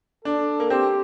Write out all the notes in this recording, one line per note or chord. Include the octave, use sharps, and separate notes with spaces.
D4 A4
A#3
C4 G4